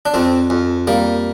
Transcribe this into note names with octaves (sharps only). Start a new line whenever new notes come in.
D4
F2 C4
F2
G3 A#3